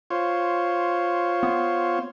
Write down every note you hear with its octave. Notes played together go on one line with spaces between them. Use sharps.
F4 C5 C#5
B3